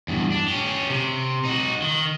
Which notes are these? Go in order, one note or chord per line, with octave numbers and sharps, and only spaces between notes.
E2 G2
D4
C#4 G4
C3
D#4 F#4
D#3